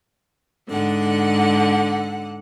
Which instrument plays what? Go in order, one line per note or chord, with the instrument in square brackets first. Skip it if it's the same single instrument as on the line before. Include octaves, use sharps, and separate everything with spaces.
[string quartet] G#2 D3 F#5